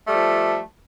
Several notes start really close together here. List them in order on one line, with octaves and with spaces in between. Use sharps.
A3 G3 F3